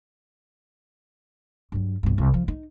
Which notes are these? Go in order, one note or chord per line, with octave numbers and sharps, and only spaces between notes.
G2 F#3
B1 G2
C2
F3
D#4